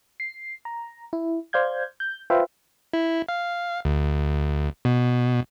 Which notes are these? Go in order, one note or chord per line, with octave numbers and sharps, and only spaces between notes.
C7
A#5
E4
C5 D5 F5 G6 G#6
G6
F4 B4 C5 E5 F5 G5
E4
F5
D2
B2